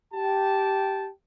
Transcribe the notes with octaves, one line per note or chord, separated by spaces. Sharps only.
G4 G5 A5